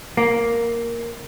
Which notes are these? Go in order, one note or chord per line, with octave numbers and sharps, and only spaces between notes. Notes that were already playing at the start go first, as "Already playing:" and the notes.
A#3